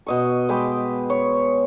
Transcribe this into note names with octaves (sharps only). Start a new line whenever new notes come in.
B2 D#5 C#6
G#3 B4 G5 D6
C#5